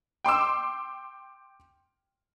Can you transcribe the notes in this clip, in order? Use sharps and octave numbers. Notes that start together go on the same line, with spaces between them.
G5 C6 D6 E6